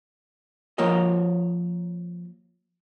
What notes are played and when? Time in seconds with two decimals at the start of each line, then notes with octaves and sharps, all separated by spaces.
0.78 F3 A#3 F4 A#4 C#5 D#5